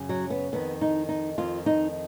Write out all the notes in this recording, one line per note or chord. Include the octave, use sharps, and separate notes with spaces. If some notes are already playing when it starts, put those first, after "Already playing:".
Already playing: F#2 C#3
F#3
B3
F2 D#3 B3
D#4
D#4
F2 D#3 F4
D#4